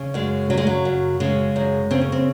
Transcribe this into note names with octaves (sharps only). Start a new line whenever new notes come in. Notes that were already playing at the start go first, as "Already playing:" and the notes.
Already playing: C#3
F#2 G#3
C#3 F#3
G#3
F#3
F#2
C#3 G#3
F#2
C#3 C4
C#4
C4